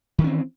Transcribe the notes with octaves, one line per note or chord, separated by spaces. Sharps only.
D#3 E3 C4 C#4